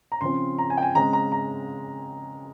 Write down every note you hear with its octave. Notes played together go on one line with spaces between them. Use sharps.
A#5
C#3 F3 C4 C6
A#5
G#5
G5
G#5
C#3 G#3 C4 A#5
A#5
A#5